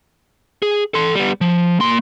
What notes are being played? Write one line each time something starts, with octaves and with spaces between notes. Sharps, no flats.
G#4
A4 C6
G3 B3
F3
A#3 C6